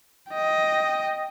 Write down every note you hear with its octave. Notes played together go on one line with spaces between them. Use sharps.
D#5 G5